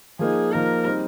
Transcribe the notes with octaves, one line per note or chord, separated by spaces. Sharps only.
F3 A#3 D#4 G#4
F3 A#3 D#4 A#4
G3 C4 D#4